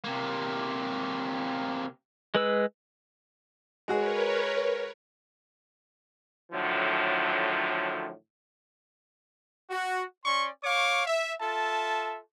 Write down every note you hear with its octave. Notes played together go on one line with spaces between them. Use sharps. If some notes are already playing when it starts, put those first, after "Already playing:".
C3 A#3
G#3 B4 E6
G#3 F#4 G#4 A#4 B4 C#5
A2 D3 D#3 F3 F#3
F#4
C#4 D5 C6 C#6
C#5 F5 C#6 D6
E5
F4 A4 E5 A5